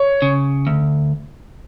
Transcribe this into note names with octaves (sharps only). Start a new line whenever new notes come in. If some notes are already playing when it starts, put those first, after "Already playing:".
Already playing: C#5
C#3
D2